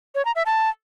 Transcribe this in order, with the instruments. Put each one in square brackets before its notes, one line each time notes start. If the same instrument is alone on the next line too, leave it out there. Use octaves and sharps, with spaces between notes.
[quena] C#5
A#5
E5
A5